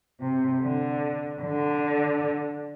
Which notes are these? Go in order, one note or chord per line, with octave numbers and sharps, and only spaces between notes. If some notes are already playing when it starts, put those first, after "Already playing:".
C3
D3
D3